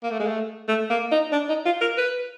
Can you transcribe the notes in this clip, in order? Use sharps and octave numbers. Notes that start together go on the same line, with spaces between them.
A#3
A3
G#3
A3
A3
A#3
D#4
D4
D#4
F4
A#4
B4